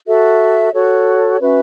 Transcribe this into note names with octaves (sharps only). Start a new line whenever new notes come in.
F#4 A4 E5
F#4 A4 C#5
C#4 F#4 B4 E5